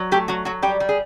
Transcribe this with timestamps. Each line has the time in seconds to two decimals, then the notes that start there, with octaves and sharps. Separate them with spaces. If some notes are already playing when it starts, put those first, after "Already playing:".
Already playing: F#3
0.12 A3 G4
0.28 F#3 F#4
0.45 F#3 F#4
0.63 G3 G4
0.80 G3
0.89 G#4